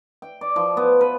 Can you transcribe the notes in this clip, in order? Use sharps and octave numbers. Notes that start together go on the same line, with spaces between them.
G5
D5
F3
B3
B4